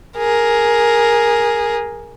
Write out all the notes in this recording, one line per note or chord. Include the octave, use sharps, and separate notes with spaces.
G#4 A#4